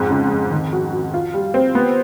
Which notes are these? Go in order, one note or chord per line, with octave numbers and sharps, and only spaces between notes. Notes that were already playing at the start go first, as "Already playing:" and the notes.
Already playing: F2 G#2
C#3
F2
D#3
F#4
F#4
F4
G3
C4
B3